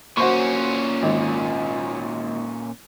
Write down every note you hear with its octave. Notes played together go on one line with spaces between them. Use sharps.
A#2 C#4 F#4 C5 C#6
G#1